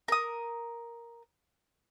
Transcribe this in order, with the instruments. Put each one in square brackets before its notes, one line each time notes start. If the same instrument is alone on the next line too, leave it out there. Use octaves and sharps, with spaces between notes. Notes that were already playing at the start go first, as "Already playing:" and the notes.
[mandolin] A#4 D#6